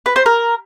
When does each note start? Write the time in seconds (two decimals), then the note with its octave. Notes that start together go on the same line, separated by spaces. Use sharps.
0.06 B4
0.16 C5
0.26 A#4